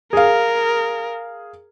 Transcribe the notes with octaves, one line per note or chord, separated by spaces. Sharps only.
G#4 A#4 F5